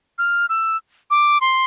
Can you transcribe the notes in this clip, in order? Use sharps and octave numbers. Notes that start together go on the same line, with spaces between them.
F6
E6
D6
C6